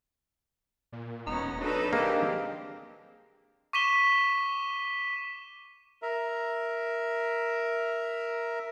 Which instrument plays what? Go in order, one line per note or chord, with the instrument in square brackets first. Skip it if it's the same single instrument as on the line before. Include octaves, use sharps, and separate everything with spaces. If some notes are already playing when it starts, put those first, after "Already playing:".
[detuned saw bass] A#2
[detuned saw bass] E1 [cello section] B3 C#4 [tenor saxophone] D#4
[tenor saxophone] F#3 [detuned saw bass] D4 [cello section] D#4 A4 B4
[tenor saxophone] G#3 [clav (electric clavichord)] A#3 [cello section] C4 G4
[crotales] C#6 D6 B6 D#7 E7 G7
[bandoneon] A#4 E5 A#5